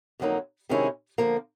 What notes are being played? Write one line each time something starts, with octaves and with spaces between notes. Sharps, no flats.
F2 D3 F#3 A#3 D#4
C3 D#3 G#3 C#4 E4
D3 F3 A#3